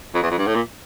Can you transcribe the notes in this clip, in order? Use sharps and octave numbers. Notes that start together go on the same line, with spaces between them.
F2
E2
F2
G2
A2
A#2